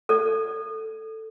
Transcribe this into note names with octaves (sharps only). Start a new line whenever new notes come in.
A4 D5